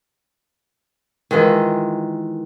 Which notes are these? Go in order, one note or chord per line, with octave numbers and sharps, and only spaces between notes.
D#3 E3 G#3 F4